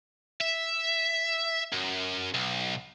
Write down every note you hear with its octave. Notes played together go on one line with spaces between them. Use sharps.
E5
F#2
B1